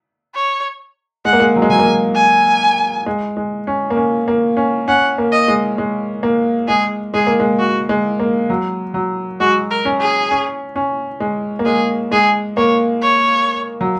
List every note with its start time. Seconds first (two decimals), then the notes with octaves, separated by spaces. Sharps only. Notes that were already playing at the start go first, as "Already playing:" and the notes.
0.35 C#5
1.25 G#3 F#5
1.33 A#3
1.40 G#3
1.56 F#3
1.62 G#3
1.70 F#3 G#5
1.79 A#3
1.86 G#3
2.15 G#5
3.06 G#3
3.37 G#3
3.67 C#4
3.90 A#3
3.96 C#4
4.28 A#3
4.57 C#4
4.88 C#4 F#5
5.18 A#3
5.32 D#5
5.48 G#3
5.78 G#3
6.23 A#3
6.68 G#3 G#4
7.14 G#3 G#4
7.27 A#3
7.40 G#3
7.59 F#4
7.89 G#3
8.19 A#3
8.50 F#3
8.94 F#3
9.40 G#3 F#4
9.71 A#4
9.85 C#4
10.00 G#4
10.31 C#4
10.76 C#4
11.20 G#3
11.59 A#3
11.66 G#3 G#4
12.11 G#3 G#4
12.57 A#3 C#5
13.02 C#5
13.81 F#3